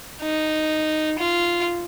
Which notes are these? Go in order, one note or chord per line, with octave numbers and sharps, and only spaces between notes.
D#4
F4